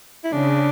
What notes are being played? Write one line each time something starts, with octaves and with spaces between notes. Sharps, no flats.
E4
C#3 D4